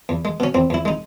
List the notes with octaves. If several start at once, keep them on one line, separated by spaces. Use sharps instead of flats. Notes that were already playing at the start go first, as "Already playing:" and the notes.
E2
G#3
B2 C#4
E2 C4
E2 E4
G#3 D#4